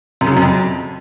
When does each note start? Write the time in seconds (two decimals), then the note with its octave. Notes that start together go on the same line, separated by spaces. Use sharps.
0.21 F#2
0.26 C#3
0.31 F#3
0.37 F#2
0.42 F2